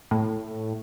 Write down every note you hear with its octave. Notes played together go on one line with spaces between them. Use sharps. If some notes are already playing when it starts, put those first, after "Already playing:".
A2